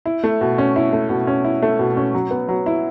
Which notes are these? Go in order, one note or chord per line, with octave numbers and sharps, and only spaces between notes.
E4
A3
B2
C#4
E4
A3
B2
C#4
E4
A3
B2
C#4
F#3
B3
F#3
E4